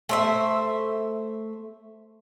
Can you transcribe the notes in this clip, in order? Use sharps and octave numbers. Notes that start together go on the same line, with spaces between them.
A3 C5 E5